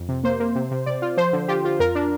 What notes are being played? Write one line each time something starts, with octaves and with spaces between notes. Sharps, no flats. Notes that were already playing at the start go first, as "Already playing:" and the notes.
Already playing: F2
C3
A#3 C5
A#3
C3
C3
C3 D5
F4
F3 C5
D3
F4 G4
F4
F2 A#4
D4